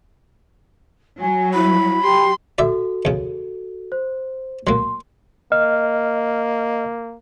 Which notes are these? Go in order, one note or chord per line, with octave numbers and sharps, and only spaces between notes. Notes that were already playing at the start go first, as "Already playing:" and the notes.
F#3 G#5
E4 B5
G4 C6
F#4 A4 D5 E5
E2 C#3
C5
F#3 A#3 C6
A#3 D#5 F6